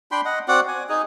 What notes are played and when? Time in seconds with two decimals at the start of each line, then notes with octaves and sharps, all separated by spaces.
0.11 D4 G5 B5 C6
0.25 D#5 F#5
0.48 C4 F#4 D5 F#5
0.68 G#5
0.89 D#4 G#4